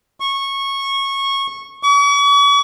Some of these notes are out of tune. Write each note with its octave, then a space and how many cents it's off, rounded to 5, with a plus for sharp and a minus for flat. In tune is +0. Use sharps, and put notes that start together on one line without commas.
C#6 -15
C#6 +45